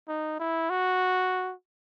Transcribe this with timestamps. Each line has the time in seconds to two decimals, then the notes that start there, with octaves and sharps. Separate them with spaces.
0.08 D#4
0.39 E4
0.70 F#4